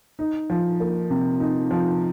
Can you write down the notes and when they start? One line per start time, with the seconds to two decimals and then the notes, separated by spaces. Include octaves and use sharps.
0.19 D#4
0.50 F3
0.80 A#3
1.10 C3
1.40 D#4
1.71 F3